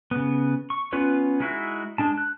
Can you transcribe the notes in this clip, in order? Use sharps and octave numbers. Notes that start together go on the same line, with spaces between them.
C#3 B3
C#6
B3 C#4 F4 B4 C#5
G#3 D#4 E4 F#4 E5
G#3 D4 A5
F#6